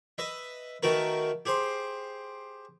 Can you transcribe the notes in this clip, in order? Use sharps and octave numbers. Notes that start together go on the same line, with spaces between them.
B4 D#5 E5
D#3 A3 F#4 A#4 B4
G4 G#4 C5 C6